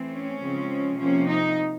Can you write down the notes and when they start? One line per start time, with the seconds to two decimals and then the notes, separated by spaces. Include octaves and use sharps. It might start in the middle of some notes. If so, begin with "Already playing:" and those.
Already playing: E3 A3 C4
0.11 C#4
0.41 C#3 F3 G#3 C4
0.98 C3 F3 A#3 C#4
1.28 D#4